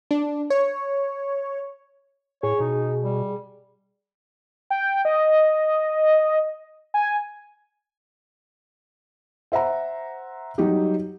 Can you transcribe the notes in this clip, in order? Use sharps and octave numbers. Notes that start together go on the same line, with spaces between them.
D4
C#5
A2 G#4 C#5
B2 D#4
G3
G5
D#5
G#5
C5 E5 F#5 A#5
F#3 G3 D#4 G4